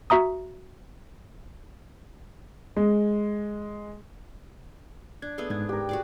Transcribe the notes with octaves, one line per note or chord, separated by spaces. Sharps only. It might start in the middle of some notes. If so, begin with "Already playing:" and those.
F#4 E5 A#5 D#6
G#3
D4 G#6
A3 B3 G#4
G#2 D4 G#6
G4 A#4
F#4 G#4 D5